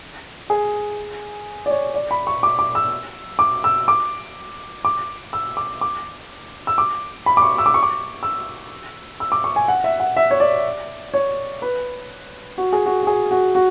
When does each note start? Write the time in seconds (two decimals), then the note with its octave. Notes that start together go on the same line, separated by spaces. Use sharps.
0.50 G#4
1.66 D5
1.71 C#5
1.94 D5
2.11 B5
2.27 C#6
2.43 D6
2.59 D6
2.75 E6
3.39 D6
3.64 E6
3.88 D6
4.85 D6
5.33 E6
5.57 D6
5.81 D6
6.67 E6
6.78 D6
7.26 B5
7.37 D6
7.42 C#6
7.58 E6
7.66 D6
7.74 C#6
7.83 D6
8.23 E6
9.20 E6
9.32 D6
9.44 C#6
9.56 G#5
9.68 F#5
9.84 E5
10.00 F#5
10.17 E5
10.31 C#5
10.40 D5
11.14 C#5
11.62 B4
12.58 F#4
12.73 G#4
12.86 F#4
13.03 F#4
13.07 G#4
13.31 F#4
13.55 F#4